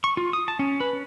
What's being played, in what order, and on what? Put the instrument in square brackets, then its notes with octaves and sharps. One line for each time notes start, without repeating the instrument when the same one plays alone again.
[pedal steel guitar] C#6
F4
D#6
A5
C#4
B4
C#4